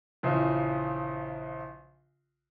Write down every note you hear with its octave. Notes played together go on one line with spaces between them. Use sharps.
A#1 C#3 E3 F3